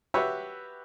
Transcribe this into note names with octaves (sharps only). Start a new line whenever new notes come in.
F#4 G4 B4 C#5 E5